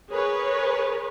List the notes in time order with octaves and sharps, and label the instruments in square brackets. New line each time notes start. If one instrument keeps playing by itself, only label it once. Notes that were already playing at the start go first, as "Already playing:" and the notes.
[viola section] G#4 A#4 B4 C#5